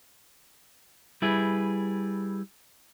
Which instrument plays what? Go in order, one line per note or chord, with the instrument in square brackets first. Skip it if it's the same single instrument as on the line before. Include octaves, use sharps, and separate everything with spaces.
[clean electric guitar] G3 E4 G#4 B4